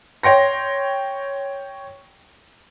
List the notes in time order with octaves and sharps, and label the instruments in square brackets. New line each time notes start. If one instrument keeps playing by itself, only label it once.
[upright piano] C#5 G5 C6 A#6